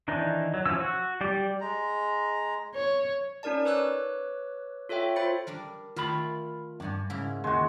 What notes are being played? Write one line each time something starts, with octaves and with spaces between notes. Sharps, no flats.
D#3 E3 D4 D#4
F#3
E3 F3 C#4 E6
F#4
G3 G4 D5
G#3 A#5
C#5
C#4 D#4 A#4 D5 A5
B4 C#5 D6 E6 F#6
F4 A4 C#5 E5 G5
F4 C5 B5 A6 C#7
G3 D4 A#4
D#3 A3 F4 A5 B5
E2 G2 D4 F#5 G#5
G#2 C#3 A#3 E4
D#2 G#3 F#4